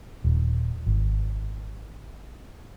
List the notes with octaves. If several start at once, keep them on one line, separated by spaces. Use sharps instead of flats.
D#1
G#1